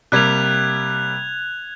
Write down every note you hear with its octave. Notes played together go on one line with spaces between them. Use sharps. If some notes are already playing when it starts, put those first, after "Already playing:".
C3 G3 A#3 F#6 G#6 F7